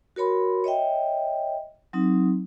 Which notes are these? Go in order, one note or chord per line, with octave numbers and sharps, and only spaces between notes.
F#4 A#4 C#5 B5 C6
C#5 D#5 E5 G5
F#3 C4 D#4